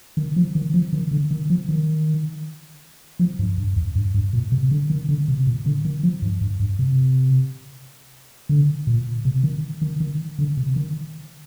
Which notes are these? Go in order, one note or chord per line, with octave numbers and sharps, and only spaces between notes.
D#3
F3
D#3
F3
D#3
D3
D#3
F3
D#3
F3
G2
G2
F2
G2
G2
A#2
C3
D3
D#3
D3
C3
A#2
D3
D#3
F3
G2
G2
G2
C3
D3
A#2
C3
D#3
D#3
D#3
D3
C3
D#3